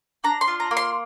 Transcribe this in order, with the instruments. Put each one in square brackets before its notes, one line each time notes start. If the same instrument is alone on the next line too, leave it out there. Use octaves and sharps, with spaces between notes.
[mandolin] D4 A#5
C6
F4
A#5
A#3
C6